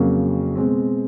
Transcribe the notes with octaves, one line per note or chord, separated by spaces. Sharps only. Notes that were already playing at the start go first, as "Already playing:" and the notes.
Already playing: F2 C#3 F#3 A#3
B2 G#3 C4